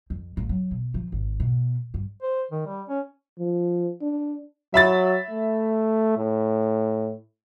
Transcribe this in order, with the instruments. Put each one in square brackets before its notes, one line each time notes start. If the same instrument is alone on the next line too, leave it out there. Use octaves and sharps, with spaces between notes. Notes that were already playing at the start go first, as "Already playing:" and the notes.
[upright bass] F2
A1
F#3
B2
F3
G#1
B2
G2
[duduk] C5
D#3
G3
C#4
[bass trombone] F3
D4
[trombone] F#3 [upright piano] E5 B5 A6
[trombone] A3
A2